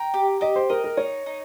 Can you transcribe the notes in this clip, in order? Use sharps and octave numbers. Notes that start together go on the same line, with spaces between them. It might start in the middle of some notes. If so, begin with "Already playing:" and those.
Already playing: G5 A#5
G4
G4 D#5
C5
A#4 D#5
A#4
D#4 C#5
D#4